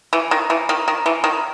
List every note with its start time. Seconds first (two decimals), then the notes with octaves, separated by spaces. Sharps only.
0.13 E3
0.31 D#3
0.50 E3
0.69 D#3
0.88 D#3
1.06 E3
1.24 D#3